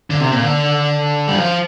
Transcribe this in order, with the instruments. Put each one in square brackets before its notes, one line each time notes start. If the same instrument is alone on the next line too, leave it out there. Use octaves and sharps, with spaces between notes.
[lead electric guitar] D3
C3
A#2
D3
G3
F3